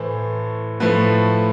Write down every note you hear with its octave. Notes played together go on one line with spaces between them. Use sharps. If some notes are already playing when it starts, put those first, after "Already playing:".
Already playing: A2 E3 A3 C5
A2 F3 A3 B4